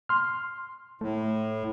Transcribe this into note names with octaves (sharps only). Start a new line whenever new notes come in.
C6 F6
A2 A3